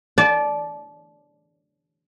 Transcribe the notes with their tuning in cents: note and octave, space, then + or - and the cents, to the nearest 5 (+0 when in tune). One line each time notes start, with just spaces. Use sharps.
D5 +0 A5 -25